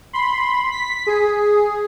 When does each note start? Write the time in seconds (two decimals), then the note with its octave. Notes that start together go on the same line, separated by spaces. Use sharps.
0.13 B5 C6
0.72 B6
1.07 G#4